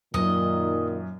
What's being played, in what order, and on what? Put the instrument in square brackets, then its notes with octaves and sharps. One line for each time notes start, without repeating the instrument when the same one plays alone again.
[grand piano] F#2 [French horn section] A#2 D#3 [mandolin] D#5